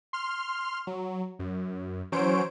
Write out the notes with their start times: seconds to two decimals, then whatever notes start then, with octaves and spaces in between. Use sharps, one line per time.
0.13 C6 F6
0.87 F#3
1.39 F#2
2.12 E3 F#3 C#4 C5 C#5 D7